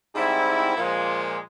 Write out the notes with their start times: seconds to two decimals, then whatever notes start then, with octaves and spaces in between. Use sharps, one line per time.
0.14 G#2 G3 C4 E4
0.76 A#2 F3 G#3